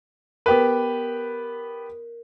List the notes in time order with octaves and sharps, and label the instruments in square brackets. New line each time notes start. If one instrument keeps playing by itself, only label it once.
[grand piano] B3 G4 B4 [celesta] A#4